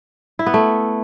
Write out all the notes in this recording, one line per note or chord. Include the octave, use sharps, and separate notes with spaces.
E4
B3
A3